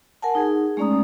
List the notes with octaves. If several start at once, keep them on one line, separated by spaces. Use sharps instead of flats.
A#4 F#5 G#5 A5
D#4 G#4
G#3 A3 C#4 D5 A#5 D#6